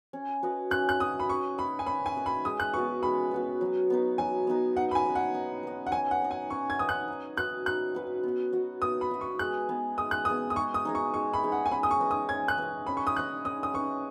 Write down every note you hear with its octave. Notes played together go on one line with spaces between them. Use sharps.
C#4
F#4 B4 D#5
C#4 F#6
F#6
F#4 B4 D#5 D#6
B5
C#4 C#6
B4 D#5 B5
G#5
C#4 B5
G#5
B4 D#5
B5
G#3 D#6
F#6
B3 F#4 B4 C#6
G#3 B5
B3 F#4 B4
F#3
B3 D#4 B4
F#3 G#5
B3 D#4 B4
D#4 F#5
B5
G#5
B4 D#5
F#5
D#4
B4 D#5
F#5
C#4 G#5
F#5
B4 D#5
G#5
C#4 C#6
G#6
B4 D#5 D#6
F#6
D#4
F#4 B4 F#6
D#4 F#6
F#4 B4
B3
F#4 D#5
B3 D#6
B5
F#4 D#5
C#6
G#3 F#6
B3 G#4 D#5
G#3 D#6
F#6
B3 G#4 D#5 D#6
D#6
G#3 C#6
D#6
D#4 G#4 D#5
C#6
G#3 C#6
B5
D#4 G#4 D#5
F#5
G#5
C#4 B5
D#6
C#6
B4 D#5
D#6
C#4 G#6
F#6
B4 D#5
C#4 B5
C#6
D#6
B4 D#5 F#6
C#4 D#6
D#6
B4 D#5 C#6